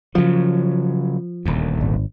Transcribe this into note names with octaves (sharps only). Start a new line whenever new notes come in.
C#3 F3 F#3
D#1 D2
G#1